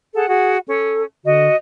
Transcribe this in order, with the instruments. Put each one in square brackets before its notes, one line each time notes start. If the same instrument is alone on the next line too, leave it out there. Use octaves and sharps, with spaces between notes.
[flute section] G#4 A4 F#5
[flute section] F#4 G#4 [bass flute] F#5
[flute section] C#4 [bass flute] A4
[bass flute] D3 [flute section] F#4 D#5